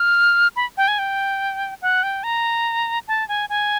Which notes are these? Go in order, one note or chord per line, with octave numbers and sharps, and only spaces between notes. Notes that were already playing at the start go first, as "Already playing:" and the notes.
Already playing: F6
B5
G5
G#5
G5
F#5
G5
A#5
A5
G#5
G#5